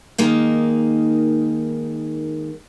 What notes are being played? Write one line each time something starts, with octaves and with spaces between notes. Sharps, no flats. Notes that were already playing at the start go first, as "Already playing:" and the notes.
D#3 G#3 A#3 D#4